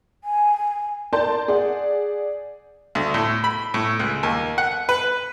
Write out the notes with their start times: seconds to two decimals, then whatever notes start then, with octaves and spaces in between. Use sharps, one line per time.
0.24 G#5
1.13 A#4 D5 A5 C6 G6
1.48 G#4 D5 F#5
2.95 D2
3.14 A2
3.44 B5
3.74 A2
3.99 C#2
4.23 D#2
4.58 F#5
4.89 B4